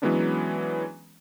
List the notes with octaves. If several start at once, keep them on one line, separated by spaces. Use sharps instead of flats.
E3 F#3 G#3 B3 C#4 D4